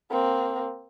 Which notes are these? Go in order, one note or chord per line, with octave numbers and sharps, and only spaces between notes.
A#3 C4